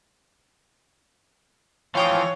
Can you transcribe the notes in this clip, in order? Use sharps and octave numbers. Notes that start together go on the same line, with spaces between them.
E3 F3 C#5 F5 G5 D#6